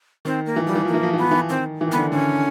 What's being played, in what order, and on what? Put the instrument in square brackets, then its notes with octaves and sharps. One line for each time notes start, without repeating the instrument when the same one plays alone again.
[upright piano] D#3 [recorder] C4
[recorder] A#3
[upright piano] E3
[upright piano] F3 [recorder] G3
[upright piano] E3
[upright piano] F3 [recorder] A#3
[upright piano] E3
F3
E3
[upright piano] F3 [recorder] B3
[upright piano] E3
[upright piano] D#3 [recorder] C4
[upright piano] E3
D#3
[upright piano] D3 [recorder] B3
[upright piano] D#3
[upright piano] D3 [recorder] C#4